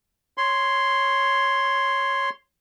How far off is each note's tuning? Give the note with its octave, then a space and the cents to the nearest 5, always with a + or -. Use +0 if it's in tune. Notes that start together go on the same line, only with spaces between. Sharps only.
C#5 +0 C6 +0